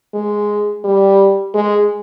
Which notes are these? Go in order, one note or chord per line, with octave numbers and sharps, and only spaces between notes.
G#3
G3
G#3